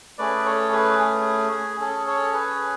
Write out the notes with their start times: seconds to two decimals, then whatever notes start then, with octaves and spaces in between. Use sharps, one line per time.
0.18 A3 C#4 G#4 B4 D5
0.45 A4 C#5
0.72 G#4 B4
0.99 G#4
1.80 C#4 G#4 A4
2.07 A4 C#5
2.33 G#4 B4